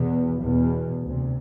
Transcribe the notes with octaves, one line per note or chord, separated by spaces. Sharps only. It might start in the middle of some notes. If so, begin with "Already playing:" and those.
Already playing: E2 B2 B3
E2 B2
D2 C3